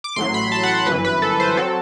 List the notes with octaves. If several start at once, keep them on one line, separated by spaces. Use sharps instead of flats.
D6
A1 A2 F#3 C6
B5
A5
F#5
G1 F#2 E3 B4
B4
A4
C5
F#3 C4 A4